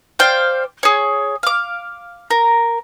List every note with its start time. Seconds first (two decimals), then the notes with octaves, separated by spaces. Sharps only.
0.19 C5 D5 F5 G5
0.83 G#4 C#5
1.43 F5 D6
2.30 A#4